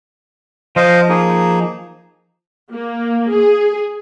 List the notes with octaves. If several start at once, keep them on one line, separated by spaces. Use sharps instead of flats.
F3 C5 D#5 F5
A#3 D#4 G#4
A#3
G#4